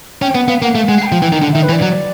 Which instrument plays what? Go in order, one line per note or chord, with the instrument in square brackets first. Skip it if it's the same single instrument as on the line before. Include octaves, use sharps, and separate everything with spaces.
[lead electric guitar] C#4 [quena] G5
[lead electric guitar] B3 [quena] F#5
[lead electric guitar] B3 [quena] F5
[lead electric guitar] A#3 [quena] F#5
[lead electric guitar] A3 [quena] F5
[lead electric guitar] G#3 [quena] F#5
[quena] B5
G5
[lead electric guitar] F3
E3
D#3
D3
[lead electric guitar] D#3 [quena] E5
[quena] B4
[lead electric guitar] E3
[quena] D5
[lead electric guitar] F#3